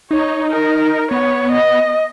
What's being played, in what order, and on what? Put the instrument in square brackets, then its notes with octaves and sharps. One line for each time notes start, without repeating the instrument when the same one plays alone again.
[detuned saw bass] D#4 [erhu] C#5
[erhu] A#4
[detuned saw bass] B3 [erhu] C#5
[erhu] D#5